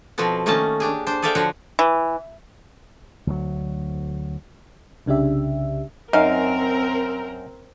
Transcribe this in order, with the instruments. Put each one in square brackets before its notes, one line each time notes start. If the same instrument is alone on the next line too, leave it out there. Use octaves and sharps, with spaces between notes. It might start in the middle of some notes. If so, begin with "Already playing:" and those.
[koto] B2 F3 C4 F#4 A4
D#3 A3 A#3 C#4 D#5 A5
D4 G4 G#4
D4 C5
G#4 A4 D5 E5 F5 G5
D3 F3 F#4 C#5 F#5
[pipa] E3
[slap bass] D2 F#3
[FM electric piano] C2 C#3 D4 G4 E5
[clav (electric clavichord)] F#2 [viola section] C4 A#4 [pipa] D#4 F5